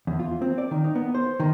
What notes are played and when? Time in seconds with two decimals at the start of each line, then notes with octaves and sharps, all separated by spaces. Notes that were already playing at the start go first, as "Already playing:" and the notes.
0.07 E2
0.19 F4
0.41 C4
0.58 D5
0.71 D#3
0.84 D#4
0.95 B3
1.15 C5
1.40 D#3